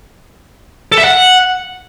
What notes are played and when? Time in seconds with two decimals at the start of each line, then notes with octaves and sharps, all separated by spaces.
0.92 A4
0.98 E5
1.04 F#5